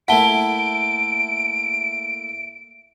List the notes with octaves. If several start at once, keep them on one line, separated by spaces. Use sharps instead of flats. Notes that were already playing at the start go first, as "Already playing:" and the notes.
A3 A#3 E4 F#5 A5 D7 G7